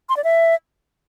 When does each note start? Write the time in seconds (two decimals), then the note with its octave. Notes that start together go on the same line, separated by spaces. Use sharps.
0.09 C6
0.17 D5
0.24 E5